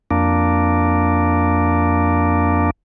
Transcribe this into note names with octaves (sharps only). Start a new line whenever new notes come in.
F2 A#3 D4